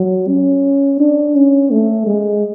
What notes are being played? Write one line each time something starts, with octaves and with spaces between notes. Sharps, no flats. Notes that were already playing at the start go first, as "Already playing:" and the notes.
Already playing: F#3
C#4
D4
C#4
A3
G#3